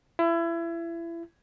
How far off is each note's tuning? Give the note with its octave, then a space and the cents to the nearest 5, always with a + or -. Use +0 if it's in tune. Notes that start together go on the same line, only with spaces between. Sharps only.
E4 +30